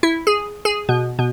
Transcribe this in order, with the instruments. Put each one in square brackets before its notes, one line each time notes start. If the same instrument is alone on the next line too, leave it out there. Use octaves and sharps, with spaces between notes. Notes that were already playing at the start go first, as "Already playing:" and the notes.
[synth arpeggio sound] E4
G#4
G#4
B2
B2